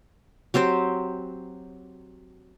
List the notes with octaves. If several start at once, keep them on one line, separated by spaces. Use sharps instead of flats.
F#3 C4 G4 C5